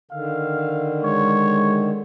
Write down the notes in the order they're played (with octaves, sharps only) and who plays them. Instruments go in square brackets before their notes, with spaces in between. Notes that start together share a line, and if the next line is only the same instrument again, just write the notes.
[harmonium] D3 D#3 [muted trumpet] F5
[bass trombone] G#3 [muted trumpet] C#5